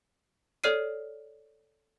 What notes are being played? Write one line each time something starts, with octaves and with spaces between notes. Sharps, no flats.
A4 C#5 D5 F6 C7 D#7